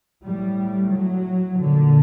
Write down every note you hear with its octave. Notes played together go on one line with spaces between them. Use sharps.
A2 G3
F#3
A#2 D3